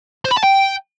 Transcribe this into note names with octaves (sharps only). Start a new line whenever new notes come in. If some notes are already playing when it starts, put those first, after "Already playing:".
C5
B5
A5
G5